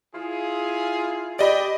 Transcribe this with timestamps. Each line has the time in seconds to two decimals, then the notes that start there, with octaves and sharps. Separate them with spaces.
0.15 E4 F4 G#4
1.39 G4 D5 D#5 B5